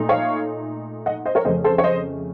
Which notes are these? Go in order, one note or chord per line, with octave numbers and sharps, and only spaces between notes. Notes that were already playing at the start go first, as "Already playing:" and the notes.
Already playing: A#2 A3 D#4
C#5 F5
D#5 F#5
C5 D#5
A#4 C#5
F2 C#3 A3 C#4 C5 D#5
A4 C5
C#5
C5 D#5